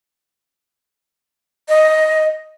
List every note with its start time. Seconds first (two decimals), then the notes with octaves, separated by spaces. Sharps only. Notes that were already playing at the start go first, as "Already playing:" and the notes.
1.68 D#5